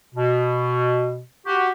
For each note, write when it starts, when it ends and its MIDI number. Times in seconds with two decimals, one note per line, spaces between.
0.15 1.21 47
1.47 1.71 66
1.47 1.71 67